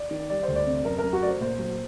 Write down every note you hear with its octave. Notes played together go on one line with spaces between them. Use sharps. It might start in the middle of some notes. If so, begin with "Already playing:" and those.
Already playing: D5
D#3
G3 D5
C5
D2
D5
C3
F#2 A#4
A#4
F#2
F#4
A3 D5
C5
A#2 C5
F#3